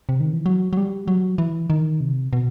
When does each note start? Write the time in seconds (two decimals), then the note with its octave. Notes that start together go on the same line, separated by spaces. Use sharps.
0.09 C3
0.20 D#3
0.33 E3
0.46 F#3
0.73 F#3
0.77 G3
1.08 F#3
1.38 E3
1.70 D#3
2.01 C3
2.33 B2